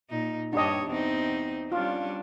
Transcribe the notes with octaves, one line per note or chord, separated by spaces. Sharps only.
A#2 D#4
G2 D4 G4 C#5 D#5
E2 C4 D#4
G3 C#4 D4 F4